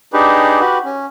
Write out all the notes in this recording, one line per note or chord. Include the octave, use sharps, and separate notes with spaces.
D4 D#4 G4 G#4 B4
F#4 G4 B4
C#4